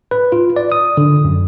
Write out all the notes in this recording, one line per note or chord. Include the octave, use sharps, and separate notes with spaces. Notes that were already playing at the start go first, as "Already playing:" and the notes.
B4
F4
D5
D#6
D3
F#2